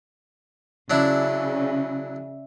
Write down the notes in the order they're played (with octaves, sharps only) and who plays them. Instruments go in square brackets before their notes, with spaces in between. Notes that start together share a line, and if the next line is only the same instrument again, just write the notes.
[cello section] C#3 [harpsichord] F#3 D4 E4 [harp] D5 E5